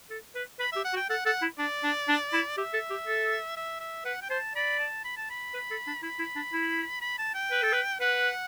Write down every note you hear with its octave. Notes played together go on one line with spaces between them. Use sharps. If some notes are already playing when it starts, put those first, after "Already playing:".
A4
B4
B4 B5
G4 E5
F#5
F#4
G5
A4 F#5
A4 F#5
E4
D4 D5
D4
D4
E4
G4 E5
A4
G4
A4
E5
E5
B4 F#5
G5
C5 A5
D5 B5
A5
B5
A5
B5
B4
A4
D4
E4 B5
E4
D4
E4
B5
A5
G5
B4
A4
B4
B4 F#5